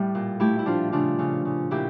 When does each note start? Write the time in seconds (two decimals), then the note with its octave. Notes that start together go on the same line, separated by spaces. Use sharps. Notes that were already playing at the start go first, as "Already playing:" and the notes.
Already playing: A2 G3 G4
0.15 A#2
0.40 A3 E4 G4
0.59 E4
0.66 F3 D4 F4
0.92 C#3 D4 F4
1.19 C#3
1.45 C#3
1.71 A#2 E4 G4